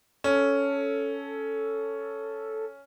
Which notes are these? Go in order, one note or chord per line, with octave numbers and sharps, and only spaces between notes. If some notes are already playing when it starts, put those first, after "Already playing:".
C#4 A4